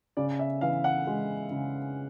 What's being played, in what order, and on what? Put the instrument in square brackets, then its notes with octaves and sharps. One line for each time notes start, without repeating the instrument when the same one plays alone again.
[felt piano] C#3 [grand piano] D5
[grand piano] E5
[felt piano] E3 [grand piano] F5
[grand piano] F#5
[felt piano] G#3
C#3